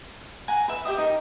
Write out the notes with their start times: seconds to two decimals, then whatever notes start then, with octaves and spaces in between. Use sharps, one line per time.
0.48 F#5 G#5 A#5
0.68 B4 E5
0.85 G4 E5 D#6
0.98 D#4 G#4 A#4